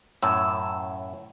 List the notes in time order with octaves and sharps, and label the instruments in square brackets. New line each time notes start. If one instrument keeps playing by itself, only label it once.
[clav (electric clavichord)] F#2 A2 [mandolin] E6